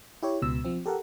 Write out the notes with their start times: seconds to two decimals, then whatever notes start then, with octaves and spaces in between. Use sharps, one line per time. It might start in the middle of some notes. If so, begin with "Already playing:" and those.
0.22 E4 G4 C#5
0.42 C#2 B2 E6
0.65 F3 C4
0.86 G4 A4 A#4 F#5